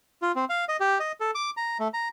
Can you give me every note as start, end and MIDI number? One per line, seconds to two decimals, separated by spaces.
0.22 0.32 65
0.36 0.45 60
0.49 0.65 77
0.69 0.77 75
0.80 0.98 67
1.00 1.12 75
1.20 1.31 69
1.35 1.50 86
1.57 1.78 82
1.79 1.88 57
1.94 2.08 82